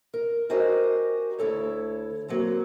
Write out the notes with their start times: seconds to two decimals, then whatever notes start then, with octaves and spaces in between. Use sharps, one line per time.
0.14 A#4
0.49 C#4 F#4 G4 A#4 C5 D#5
1.39 D2 E4 A4 C#5
2.28 F#3 A#3 C4